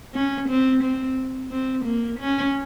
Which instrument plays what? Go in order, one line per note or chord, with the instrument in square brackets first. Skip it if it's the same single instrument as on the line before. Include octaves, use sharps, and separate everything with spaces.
[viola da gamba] C#4
C4
C4
C4
A#3
C#4